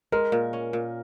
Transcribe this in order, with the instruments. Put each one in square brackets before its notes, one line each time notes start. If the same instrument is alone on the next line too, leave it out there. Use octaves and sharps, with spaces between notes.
[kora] G#3 [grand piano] A#4
[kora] A#2
C#4
A#2